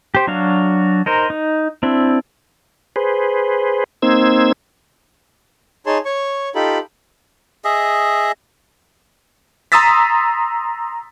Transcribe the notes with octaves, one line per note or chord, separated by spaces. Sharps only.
G4 C5
F#3 D4 F#4 F5
D#4 A#4 C5
D#4
C4 D4 E4
G#4 B4 C5
A#3 C4 D#4 C5 E6 G#6
D#4 G#4 C#5 A5 C6
C#5 C#6
D#4 F4 G4 A4 B5
G#4 D#5 E5
A#5 C6 D#6 E6 A6 B6